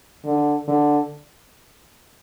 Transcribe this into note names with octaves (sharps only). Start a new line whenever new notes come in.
D3
D3